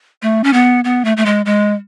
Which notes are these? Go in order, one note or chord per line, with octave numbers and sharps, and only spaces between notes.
A3
C#4
B3
B3
A3
A3
G#3
G#3